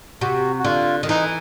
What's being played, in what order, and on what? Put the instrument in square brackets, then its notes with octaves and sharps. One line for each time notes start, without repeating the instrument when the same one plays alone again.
[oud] C3 [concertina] F#4
[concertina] F#4
[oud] D3 [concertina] F4
[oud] D#3
[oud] E3 [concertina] D#4